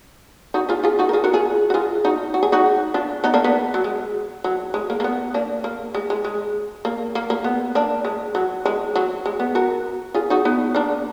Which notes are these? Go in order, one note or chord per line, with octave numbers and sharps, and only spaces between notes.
D#4 F#4
F4 G#4
F4 G#4
D#4 F#4
A#4
F4 G#4
F#4 A#4
F4 G#4
F#4
F4 G#4
D#4 F#4
F#4
G#4
D#4 F#4
D4 F4
B3 D#4
A#3 D4
B3
F#3
G#3
F#3
G#3
A#3
A#3
B3
A#3 D4
A#3
G#3
G#3
G#3
A#3
A#3
A#3
B3
A#3 D4
G#3
F#3
G#3
F#3
G#3
B3
F#4 A#4
F4 G#4
D#4 F#4
B3 D#4
A#3 D4